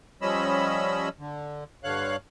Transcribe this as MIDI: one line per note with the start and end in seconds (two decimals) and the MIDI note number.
0.22 1.09 53
0.22 1.09 55
0.22 1.09 61
0.22 1.09 75
0.22 1.09 83
0.22 1.09 88
1.19 1.64 50
1.84 2.16 43
1.84 2.16 50
1.84 2.16 73
1.84 2.16 77
1.84 2.16 90